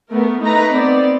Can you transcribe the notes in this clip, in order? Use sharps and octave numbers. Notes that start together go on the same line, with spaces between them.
A3 B3 A#4
A3 D#4 B4 A#5
B3 C4 D5